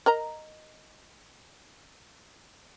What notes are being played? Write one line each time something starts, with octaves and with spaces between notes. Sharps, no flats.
A#4 D#5 A#5